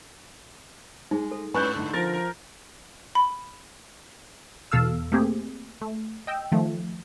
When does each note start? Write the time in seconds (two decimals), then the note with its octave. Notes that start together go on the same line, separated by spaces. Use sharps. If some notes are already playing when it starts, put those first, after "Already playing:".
1.11 G#3 D#4 G#4
1.31 A4
1.54 G#2 C#4 B4 G#5 C#6 F#6 G6
1.76 D3 D#4
1.94 F3 A#4 A6
2.13 A#4
3.15 B5
4.71 E2 B2 A4 F5 E6
5.12 A3 A#3 C4 G4 G#4
5.81 A3
6.27 D#5 G5 E6
6.52 D#3 F3 A3